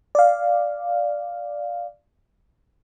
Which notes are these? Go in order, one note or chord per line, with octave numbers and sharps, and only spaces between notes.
D5 F5